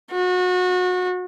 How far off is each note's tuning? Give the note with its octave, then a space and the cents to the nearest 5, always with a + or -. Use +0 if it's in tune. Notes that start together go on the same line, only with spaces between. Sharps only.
F#4 -30